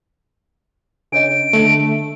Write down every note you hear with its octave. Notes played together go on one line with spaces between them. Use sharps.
C#3 D4 C#5 D#5 D7
D3 A3